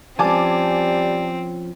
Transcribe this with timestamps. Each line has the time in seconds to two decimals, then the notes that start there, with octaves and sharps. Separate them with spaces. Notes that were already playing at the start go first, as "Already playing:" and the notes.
0.19 F3 G3 C4 C#4 G#5 A5 D6